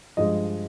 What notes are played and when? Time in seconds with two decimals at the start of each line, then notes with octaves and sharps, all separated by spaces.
0.17 G2 F3 G#3 D#5